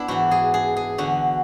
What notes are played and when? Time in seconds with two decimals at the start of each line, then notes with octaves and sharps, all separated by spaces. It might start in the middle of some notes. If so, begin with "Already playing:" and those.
Already playing: B3 D4 E4
0.08 G#2 E3 F#4
0.31 G#4
0.54 G#4
0.76 G#4
0.98 E2 D3 F#4